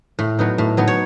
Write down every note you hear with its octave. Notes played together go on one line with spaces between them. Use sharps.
A2
F#3 B3 D#4
A2
F#3 B3 D#4
C#5